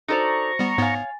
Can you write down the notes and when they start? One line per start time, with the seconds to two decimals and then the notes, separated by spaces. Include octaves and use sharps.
0.08 D#4 F#4 A4 C5 D5 A#5 C#6 F7
0.59 G3 B3
0.78 G#2 B3 C#5 F5 G#5 A6